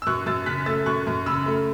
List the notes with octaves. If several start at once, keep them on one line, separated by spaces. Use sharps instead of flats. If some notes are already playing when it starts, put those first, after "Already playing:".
E6
F#2 C#6 F#6
F#2 E6 A6
C#3 F#6 B6
A3 E6 A6
F#2 C#6 F#6
F#2
C#3 B5 E6
A3